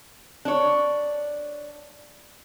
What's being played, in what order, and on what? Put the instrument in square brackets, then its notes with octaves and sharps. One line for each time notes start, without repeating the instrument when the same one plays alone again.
[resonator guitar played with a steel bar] D4 C#5